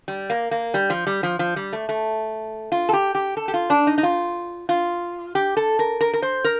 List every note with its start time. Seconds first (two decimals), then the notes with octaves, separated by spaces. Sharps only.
0.08 G3
0.30 A#3
0.51 A#3
0.74 G3
0.90 F3
1.07 G3
1.23 F3
1.39 F3
1.56 G3
1.73 A3
1.89 A3
2.72 F4
2.89 A4
2.93 G4
3.15 G4
3.37 A4
3.48 G4
3.54 F4
3.70 D4
3.87 D#4
3.98 D#4
4.03 F4
4.69 F4
5.35 G4
5.57 A4
5.79 A#4
6.01 A#4
6.13 A#4
6.22 C5
6.44 A#4